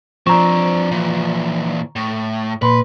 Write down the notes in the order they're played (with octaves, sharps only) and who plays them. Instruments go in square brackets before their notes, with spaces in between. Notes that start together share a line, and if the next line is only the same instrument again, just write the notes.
[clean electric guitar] F3 [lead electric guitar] C4 D4 [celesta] A#5 C#6
[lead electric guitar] A#2 E3
A2
[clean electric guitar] A#2 B5 C6 [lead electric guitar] B4